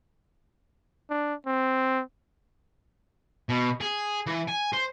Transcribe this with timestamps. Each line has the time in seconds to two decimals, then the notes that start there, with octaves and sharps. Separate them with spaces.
1.10 D4
1.46 C4
3.49 B2
3.81 G#4
4.27 E3
4.49 G#5
4.74 C5